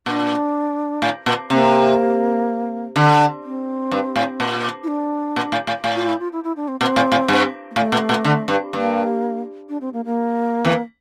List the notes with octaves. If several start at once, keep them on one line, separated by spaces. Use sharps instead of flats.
A#2 D4
A2
A#2
C3 A#3
D3
C4
G2
A2
A#2
E4
D4
A#2
A2
A2
A2
F4
E4
F4
E4
E4
D4
C4
A#2 C4
A2
A2
G2
A#3
A2 A3
A#2
A#2
D3
G2
G2 A#3
D4
C4
A#3
A#3
E2 E3